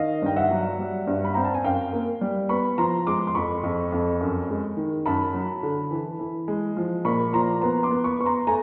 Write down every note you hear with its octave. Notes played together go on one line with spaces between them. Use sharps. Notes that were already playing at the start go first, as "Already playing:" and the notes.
Already playing: D#3 D#5 F5
G2 G5
E5 F#5
F#3
G3
G2
B5
C4 A#5
A5
G#5
F#2 F5 G5
A#3
G3
B3 B5 C#6
F3 A#5 C6
G#3 C6 D6
C6
F2 B5 C#6
F2
F2
F#2
G#3
D#3
F#2 A5 B5
F#3
D3
E3
E3
G#3
F3
A#2 B5 C#6
F3 A#5 C6
B3 A#5 C6
C6 D6
B3
B5 C#6
B3 C#6
A#5 C6
A3 G#5 A#5